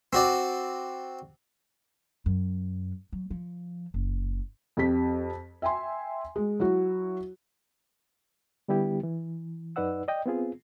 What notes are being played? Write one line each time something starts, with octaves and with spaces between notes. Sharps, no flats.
C4 F#4 D5
F#2
F#3
F3
F#1
F2 G4 B6
E5 G5 G#5 C6
G#3
F#3 E4 F#4
D3 G3 B3 E4 G4
E3
F#2 D#4 B4 D5 F#5 E6
D5 D#5 G5
B3 C4 F4 G#4